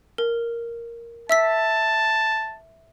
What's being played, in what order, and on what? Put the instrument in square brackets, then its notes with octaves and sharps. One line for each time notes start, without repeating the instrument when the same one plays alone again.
[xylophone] A#4
[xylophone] E5 E6 B6 [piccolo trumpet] A5